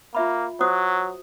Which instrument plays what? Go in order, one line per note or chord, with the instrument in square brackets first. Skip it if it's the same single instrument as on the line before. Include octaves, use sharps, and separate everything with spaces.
[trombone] A#3 [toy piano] F4 E5 B5
[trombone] F#3 [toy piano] F#4 C5 D#6